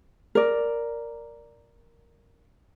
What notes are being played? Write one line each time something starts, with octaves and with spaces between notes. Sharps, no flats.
A#4 D5